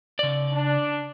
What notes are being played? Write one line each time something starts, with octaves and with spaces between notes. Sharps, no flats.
C#3 D5
D4